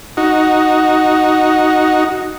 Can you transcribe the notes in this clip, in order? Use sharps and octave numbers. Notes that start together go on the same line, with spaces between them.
D#4 F#4